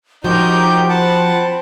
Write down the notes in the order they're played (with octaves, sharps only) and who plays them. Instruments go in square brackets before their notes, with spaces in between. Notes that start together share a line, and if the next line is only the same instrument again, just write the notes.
[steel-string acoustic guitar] F3 F#4 [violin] D#4 A#4 [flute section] G4 [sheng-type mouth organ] G6
[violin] C4 [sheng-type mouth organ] F#5 A5 [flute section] B5